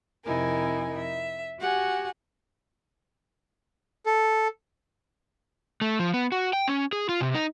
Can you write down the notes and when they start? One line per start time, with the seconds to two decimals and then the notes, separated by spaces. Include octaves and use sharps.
0.25 F2 C3 D#4 E4 A#4 G#5
0.98 E5
1.60 F#4 G4 F#5 G#5
4.06 A4
5.81 A3
5.99 F3
6.14 B3
6.32 F#4
6.53 G5
6.68 C#4
6.93 G#4
7.09 F4
7.21 C3
7.34 D#4